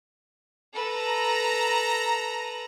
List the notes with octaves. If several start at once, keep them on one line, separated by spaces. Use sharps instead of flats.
A4 B4 A#5